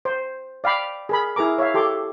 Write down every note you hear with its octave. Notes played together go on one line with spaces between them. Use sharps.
C5
D5 F5 G5 B5 D6
G#4 A#4 B5
E4 G#4 A#4 A#5 D6
C#5 E5 F5
G4 A4 C6 D6